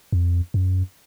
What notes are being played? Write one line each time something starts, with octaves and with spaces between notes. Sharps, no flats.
F2
F#2